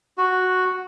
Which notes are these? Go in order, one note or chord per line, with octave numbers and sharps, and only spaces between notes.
F#4